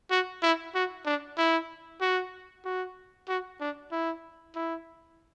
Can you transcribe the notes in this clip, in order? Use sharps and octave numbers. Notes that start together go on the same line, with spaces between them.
F#4
E4
F#4
D4
E4
F#4
F#4
F#4
D4
E4
E4